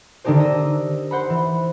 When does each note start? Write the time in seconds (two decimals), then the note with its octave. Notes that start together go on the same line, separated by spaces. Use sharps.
0.24 D3 D#3 D4 D#4 G4 C5
0.40 D#5 E6
1.11 C5 F#5 B5
1.30 E3